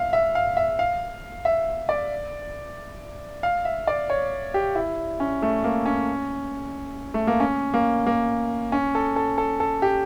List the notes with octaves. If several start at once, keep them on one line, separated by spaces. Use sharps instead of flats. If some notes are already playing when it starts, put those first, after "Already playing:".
Already playing: E5 F5
E5
F5
E5
F5
E5
D5
F5
E5
D5
C#5
G4
E4
C#4
A3
A#3
C#4
A3
A#3
C#4
A#3
A#3
C#4
A4
A4
A4
A4
G4